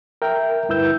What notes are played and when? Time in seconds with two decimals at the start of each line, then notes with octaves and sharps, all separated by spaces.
0.22 A#4 E5 G5
0.69 D2 G2 E4 B4 E6 G6